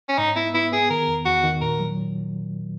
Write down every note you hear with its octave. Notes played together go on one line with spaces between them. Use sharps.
C#4
G#2 D#4
B3 E4
B3 E4
B3 G#4
D#3 A#4
E2
E2 F#4
D#3
A#2 A#4
F#3